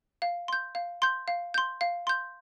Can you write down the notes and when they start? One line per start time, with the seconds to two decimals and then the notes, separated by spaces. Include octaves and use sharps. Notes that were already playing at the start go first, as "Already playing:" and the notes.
0.22 F5
0.48 C6 G6
0.75 F5
1.02 C6 G6
1.28 F5
1.54 C6 G6
1.81 F5
2.07 C6 G6